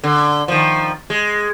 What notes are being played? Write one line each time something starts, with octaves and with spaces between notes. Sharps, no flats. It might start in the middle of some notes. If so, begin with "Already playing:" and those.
D3
D#3 F3
G#3